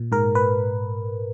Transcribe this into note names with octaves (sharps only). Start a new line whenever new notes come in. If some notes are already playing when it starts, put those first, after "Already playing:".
Already playing: A#2
G#2 A#4
B4